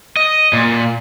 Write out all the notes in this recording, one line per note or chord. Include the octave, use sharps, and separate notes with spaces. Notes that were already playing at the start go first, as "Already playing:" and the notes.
D#5
A#2